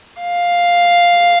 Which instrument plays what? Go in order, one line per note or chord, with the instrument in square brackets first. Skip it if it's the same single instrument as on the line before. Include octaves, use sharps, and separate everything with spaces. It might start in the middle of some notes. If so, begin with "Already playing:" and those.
[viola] F5